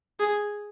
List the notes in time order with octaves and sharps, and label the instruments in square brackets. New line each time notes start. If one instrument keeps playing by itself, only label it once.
[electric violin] G#4